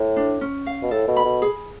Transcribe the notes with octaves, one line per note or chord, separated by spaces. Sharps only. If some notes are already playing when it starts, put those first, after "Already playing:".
Already playing: A2
D4
C#4
F5
B2
A2 A4
B2
B5
B2
G#4